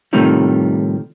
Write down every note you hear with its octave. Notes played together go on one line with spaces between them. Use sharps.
A2 C3 D#3 F3 G3